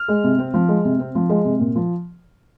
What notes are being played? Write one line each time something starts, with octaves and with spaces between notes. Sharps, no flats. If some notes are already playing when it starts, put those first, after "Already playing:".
Already playing: F6
G#3
C3
C4
F3
G#3
C3
C4
F3
G#3
C3
A#2
F3